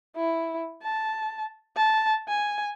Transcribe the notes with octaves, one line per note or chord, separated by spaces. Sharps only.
E4
A5
A5
G#5